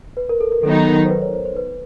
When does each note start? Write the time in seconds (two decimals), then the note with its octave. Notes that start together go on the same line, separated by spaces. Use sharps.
0.17 B4
0.29 A#4
0.41 A4
0.52 A#4
0.63 D#3 F#3 B3 D#4 A4
0.87 A#4
1.05 C5
1.10 B4
1.22 C#5
1.33 C5
1.45 C5
1.56 B4